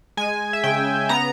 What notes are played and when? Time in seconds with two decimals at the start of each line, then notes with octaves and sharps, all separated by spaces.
0.17 G#3 G#5
0.53 E5
0.64 C#3 G5
1.09 B3 A#5